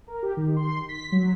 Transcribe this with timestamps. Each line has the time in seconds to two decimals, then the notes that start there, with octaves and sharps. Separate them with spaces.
0.08 A#4
0.23 G4
0.37 D#3
0.56 C6
0.89 B6
1.12 F#3